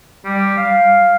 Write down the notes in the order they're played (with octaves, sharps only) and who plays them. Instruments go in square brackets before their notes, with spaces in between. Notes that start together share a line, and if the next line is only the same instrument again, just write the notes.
[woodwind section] G3
F5